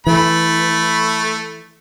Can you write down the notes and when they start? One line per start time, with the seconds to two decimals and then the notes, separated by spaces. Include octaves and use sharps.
0.07 E3 A3 B5